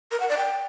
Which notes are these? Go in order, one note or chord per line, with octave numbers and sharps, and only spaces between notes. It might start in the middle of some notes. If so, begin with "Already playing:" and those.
A#4
F#5
D5
G5